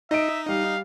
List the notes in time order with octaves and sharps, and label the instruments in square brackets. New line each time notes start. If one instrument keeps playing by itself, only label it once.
[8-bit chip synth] D#4 [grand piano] D#5 D7 [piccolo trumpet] E5
[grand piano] G3 [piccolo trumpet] F5